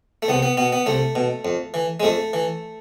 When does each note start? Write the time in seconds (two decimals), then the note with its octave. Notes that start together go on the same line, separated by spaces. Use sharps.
0.22 A3
0.28 C2 B3
0.42 B3
0.57 B2 B3
0.72 B3
0.86 C2 A3
1.15 B2
1.45 F2
1.74 E3
2.00 G#3
2.03 F2 A3
2.33 E3